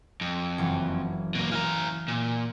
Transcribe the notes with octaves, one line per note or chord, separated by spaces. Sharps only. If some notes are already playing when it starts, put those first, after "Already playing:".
F2
F#1 E3 F#3
B2 A#3
E3 F5 A#5
A#2